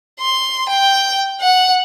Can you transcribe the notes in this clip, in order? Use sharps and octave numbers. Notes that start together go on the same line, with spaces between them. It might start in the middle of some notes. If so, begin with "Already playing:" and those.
C6
G5
F#5